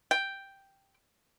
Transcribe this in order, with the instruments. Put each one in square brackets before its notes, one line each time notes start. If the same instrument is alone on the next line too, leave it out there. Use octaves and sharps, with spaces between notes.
[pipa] G5